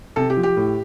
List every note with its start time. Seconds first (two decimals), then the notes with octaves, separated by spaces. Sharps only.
0.16 C3 A4
0.30 G4
0.37 F3
0.43 G4
0.57 A2